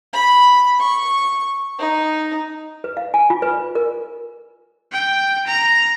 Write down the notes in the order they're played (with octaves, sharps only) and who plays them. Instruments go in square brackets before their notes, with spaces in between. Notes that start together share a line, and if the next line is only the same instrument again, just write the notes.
[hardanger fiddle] B5
C#6
D#4
[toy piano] B4
F5
G#5
F4
B4
A#4
[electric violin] G5
A#5